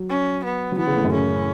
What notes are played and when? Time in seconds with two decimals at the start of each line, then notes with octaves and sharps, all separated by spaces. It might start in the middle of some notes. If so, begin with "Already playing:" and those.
Already playing: F#3
0.09 C#4
0.44 B3
0.72 F#3
0.78 E3 B3
0.87 C#3
0.96 A2
1.04 F#2
1.12 C#3 C#4